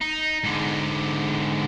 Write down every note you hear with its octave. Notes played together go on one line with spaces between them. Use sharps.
D#4
G#2 D3